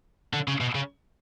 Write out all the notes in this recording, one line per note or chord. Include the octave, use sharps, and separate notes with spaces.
D3
C#3
B2
C#3